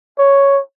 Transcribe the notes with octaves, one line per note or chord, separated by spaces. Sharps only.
C#5